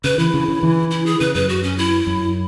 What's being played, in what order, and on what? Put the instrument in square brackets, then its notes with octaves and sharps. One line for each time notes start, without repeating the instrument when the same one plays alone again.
[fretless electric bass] C#3 [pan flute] B4
[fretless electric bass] E3 [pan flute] E4
[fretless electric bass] C#3
C#3
E3
[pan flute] E4
G#4
[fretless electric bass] C#3 [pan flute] B4
[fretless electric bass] F#2 [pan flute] B4
[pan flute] F#4
C#4
E4
[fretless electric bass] F#2